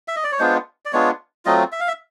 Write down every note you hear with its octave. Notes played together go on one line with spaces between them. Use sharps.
E5
D#5
D5
C#5
G#3 B3 D4 F4 C5
D5
G#3 B3 D4 F4 C#5
F#3 A3 C4 F4 D#5
E5
F5
E5